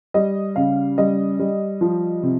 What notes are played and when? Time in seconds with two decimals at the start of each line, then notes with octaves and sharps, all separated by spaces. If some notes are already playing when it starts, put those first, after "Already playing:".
0.14 G3 D#5
0.56 C#3 F5
0.98 G3 D#5
1.40 G3
1.81 F3
2.23 C3